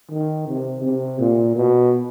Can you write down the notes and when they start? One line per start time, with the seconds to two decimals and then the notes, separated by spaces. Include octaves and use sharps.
0.11 D#3
0.48 C3
0.84 C3
1.20 A#2
1.56 B2